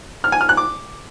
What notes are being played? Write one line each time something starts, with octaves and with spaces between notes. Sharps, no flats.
F6
G#5
F6
F#6
D6